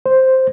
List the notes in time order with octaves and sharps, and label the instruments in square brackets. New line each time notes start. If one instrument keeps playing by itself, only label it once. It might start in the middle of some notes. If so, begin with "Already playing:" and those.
[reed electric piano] C5